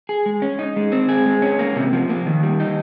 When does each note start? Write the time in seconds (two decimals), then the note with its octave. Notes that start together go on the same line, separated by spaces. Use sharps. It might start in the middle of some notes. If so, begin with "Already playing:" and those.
0.09 G#4
0.26 G#3
0.42 C#4
0.59 D#4
0.76 G#3
0.92 C4
1.09 G#4
1.25 G#3
1.42 C#4
1.59 A#3
1.76 C3
1.93 F3
2.09 A#3
2.26 D#3
2.43 G3
2.60 D#4